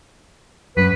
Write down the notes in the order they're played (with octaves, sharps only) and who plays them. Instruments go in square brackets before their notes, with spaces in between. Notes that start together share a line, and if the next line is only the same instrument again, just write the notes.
[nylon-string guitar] F#2 [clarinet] B4